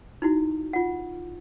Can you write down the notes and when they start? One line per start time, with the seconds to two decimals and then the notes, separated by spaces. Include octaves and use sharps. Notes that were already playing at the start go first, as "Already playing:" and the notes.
0.22 D#4 E4 F#4
0.73 F4 F#5